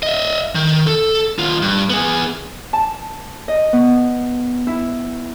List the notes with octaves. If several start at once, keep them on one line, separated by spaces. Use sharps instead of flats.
D#5 E5
D#3
A4
D#2 F4
G2
B3 G#4
A5
D#5
B3
E4